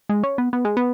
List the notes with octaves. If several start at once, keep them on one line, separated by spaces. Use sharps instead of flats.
G#3
C#4
B3
B3
G#3
B3